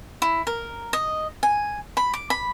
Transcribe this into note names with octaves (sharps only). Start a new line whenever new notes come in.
E4
A#4
D#5
G#5
B5
D6
B5